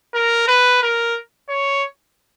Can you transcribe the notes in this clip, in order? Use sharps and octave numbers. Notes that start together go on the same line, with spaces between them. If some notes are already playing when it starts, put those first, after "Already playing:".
A#4
B4
A#4
C#5